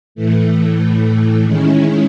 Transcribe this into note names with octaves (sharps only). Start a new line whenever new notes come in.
A2 E3 A3
D#3 G#3 C#4 E4